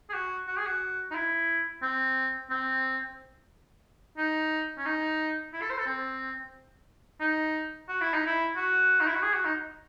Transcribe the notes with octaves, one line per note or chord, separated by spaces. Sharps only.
G#4
F#4
F#4
G#4
F#4
D#4
E4
C4
C4
D#4
C#4
D#4
E4
A4
C5
A4
C4
D#4
F#4
E4
D#4
E4
F#4
D#4
E4
F#4
G#4
F#4
D#4